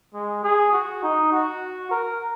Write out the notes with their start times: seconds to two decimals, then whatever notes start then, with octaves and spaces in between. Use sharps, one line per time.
0.14 G#3
0.43 G#4
0.73 F#4
1.03 D#4
1.32 F#4
1.91 A#4